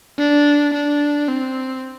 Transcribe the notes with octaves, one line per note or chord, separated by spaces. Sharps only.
D4
D4
C4